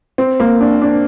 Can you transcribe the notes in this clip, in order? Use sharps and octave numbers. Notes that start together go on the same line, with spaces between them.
C4
A#3
D4
D4